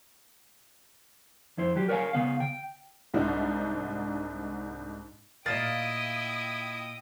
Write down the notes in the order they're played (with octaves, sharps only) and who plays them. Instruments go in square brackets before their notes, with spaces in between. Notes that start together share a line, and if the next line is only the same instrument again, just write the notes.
[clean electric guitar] F2 E4 C5
F#3 G4
A#4 B4 C#5 D5 F5 G#5
C#3 B3 F5
G5
[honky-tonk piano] C2 G#2 D4 D#4 E5
[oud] A#2 F5 [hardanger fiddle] E4 D#5 [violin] G5 D#6 [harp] A6 E7